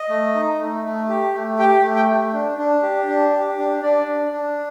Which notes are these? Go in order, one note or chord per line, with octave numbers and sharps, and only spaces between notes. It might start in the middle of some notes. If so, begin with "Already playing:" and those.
Already playing: D#5
A3
D#4
A3
A3
G4
A3
G4 G5
A3
G5
A3
D4
D4
G4
D4
G4
D4
D4 D5
D4
D4